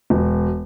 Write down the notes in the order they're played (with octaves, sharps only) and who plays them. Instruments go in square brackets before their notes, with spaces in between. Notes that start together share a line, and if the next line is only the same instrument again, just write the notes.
[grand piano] E1